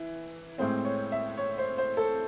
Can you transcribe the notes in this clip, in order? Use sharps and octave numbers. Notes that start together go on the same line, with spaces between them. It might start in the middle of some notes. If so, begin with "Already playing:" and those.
Already playing: E3
A2 G#3 C4 C5
C#5
E5
C#5
C5
C5
A4